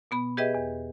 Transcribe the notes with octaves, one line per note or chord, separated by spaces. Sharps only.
B2 B3 B5
G4 G#4 B4 D#5 E5 G5
E2